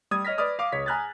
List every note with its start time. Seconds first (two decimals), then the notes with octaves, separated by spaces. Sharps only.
0.11 G3 D#6 G#6
0.25 C#5 D#5 F6 A#6 B6
0.38 B4 D5 D6 D#6 F6
0.59 F5 D6
0.72 C#2 C#5 B6
0.86 G#5 A#5 F6 F#6 G#6 A6